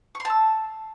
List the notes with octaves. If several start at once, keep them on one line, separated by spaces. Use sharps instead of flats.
A5 C6 C#6 E6